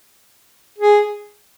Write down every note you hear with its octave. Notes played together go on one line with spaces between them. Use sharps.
G#4